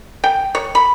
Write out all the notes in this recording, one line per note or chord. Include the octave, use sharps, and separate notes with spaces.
G5
C#5
B5